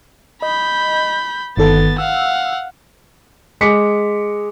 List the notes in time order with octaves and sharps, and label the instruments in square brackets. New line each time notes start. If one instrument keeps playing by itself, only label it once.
[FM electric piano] D#5 [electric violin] B5 G6
[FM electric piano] G1 D#3 A4 [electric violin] B3 A6
[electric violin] F5 F#5 [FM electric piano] E6
[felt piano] G#3 D6 B6 C#7